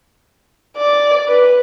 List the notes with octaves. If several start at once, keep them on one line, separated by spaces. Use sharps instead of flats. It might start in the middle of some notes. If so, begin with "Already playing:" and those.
D5
B4